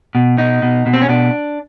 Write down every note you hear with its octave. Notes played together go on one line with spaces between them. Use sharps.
B2
B2 D#4
B2
B2
C4
C#4
B2 D4